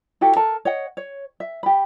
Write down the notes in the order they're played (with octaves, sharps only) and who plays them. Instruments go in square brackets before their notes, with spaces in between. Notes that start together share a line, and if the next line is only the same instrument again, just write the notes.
[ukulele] E4 F#4 G4 A4
A4 A#4 A5
C#5 D#5 F#5
C#5
E5
G4 B5